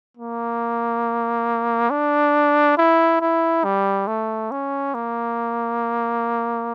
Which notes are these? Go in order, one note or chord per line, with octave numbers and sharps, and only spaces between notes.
A#3
D4
E4
E4
G3
A3
C#4
A#3